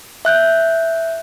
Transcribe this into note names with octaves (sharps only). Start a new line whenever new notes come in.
E5 F#6 G6